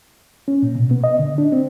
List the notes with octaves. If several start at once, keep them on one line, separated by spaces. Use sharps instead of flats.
C#4
A#2
B2
B3
D#5
D3
D4
C4